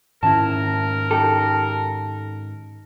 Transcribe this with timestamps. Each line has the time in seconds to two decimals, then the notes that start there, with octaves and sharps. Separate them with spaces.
0.23 G#2 D#3 C#4 E4 A#4 A5
1.11 D#4 G4 A4